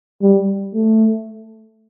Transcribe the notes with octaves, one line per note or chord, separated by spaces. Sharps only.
G3
A3